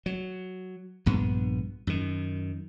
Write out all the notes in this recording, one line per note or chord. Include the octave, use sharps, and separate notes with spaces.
F#3
A#1 G2 B3
F#2 D#3